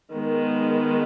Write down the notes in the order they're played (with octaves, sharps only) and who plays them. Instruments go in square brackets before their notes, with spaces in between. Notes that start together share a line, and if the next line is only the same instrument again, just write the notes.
[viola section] D#3 G#3 B3